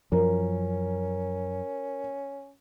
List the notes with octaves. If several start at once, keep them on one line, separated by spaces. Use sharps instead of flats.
F#2 F3 C#4 A#4